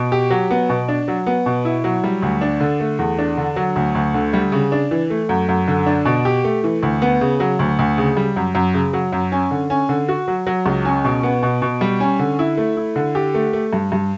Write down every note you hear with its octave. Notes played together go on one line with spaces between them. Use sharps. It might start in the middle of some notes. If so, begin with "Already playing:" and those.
Already playing: B2
G4
F#3
B3
B2
D4
F#3
B3
B2
E4
F#3
G3
D2
D4
D3
A3
E2
D4
D3
F#3
D2
D2
D3
G3
C#3
D4
E3
A3
F#2
F#2
D3
D4
B2
G4
A3
E3
D2
B3
C#3
F#3
D2
D2
C#3
G3
F#2
F#2
C#3
F#3
F#2
C#4
D3
C#4
D3
F#4
F#3
F#3
C#2
C#4
B2
B3
B2
B2
G3
C#4
D3
E4
A3
E4
D3
G4
A3
A3
G2
G2